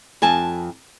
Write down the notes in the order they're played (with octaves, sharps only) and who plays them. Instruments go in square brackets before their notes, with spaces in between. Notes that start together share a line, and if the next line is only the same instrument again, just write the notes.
[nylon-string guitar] F2 G#5 A5